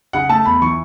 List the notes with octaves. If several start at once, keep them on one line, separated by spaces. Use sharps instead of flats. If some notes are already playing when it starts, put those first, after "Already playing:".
C#3 F#5
A3 A5
E2 B5
E3 C#6